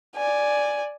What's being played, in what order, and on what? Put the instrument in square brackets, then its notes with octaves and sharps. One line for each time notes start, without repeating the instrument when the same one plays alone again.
[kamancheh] D5 G#5